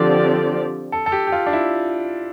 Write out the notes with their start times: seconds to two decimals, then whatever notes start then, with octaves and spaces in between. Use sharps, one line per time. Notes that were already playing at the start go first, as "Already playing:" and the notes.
Already playing: D3 F3 C4 G4 D5
0.92 A4
1.06 A4
1.12 G4
1.27 G4
1.32 F4
1.47 D4
1.53 E4